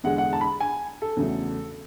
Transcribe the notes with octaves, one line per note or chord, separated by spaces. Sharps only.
E2 D3 G#3 F#5
F#5
A5
B5
G#5
A4
E2 C#3 F#3 A3